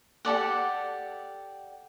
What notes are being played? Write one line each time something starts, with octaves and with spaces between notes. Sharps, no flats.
G4 A4 D5 F#5